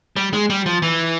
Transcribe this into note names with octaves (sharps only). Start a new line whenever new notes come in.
G3
G#3
G3
F3
E3